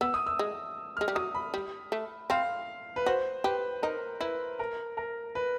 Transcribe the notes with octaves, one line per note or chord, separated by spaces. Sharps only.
B3 E6
D#6
E6
G#3
G#3 F6
G3
F#3 D#6
B5
G3
A3
C4 F5
B4
F#4 C5
G4 B4
D#4 A#4
E4 B4
A#4
A#4
B4